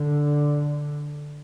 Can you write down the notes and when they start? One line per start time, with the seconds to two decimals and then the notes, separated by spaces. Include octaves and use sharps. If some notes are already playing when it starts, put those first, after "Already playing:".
Already playing: D3